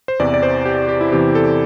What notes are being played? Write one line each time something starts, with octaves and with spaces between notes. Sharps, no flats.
C5
E2 C3 E3 D5
D5
C5
G4
G4
E4
E2 C3 E3 G4
A4